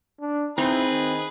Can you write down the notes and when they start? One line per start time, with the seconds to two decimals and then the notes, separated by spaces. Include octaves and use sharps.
0.21 D4
0.58 C4 D#4 E4 G#4 B4
0.90 D#3